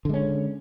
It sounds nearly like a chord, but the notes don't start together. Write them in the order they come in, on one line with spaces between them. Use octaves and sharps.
D3 G#3 C#4